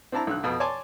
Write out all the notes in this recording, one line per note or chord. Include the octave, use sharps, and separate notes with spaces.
C4 D4 E4 A5 A#5
B1 D3 F#6
F2 B2
C#5 D5 G#5 A5 C6 D6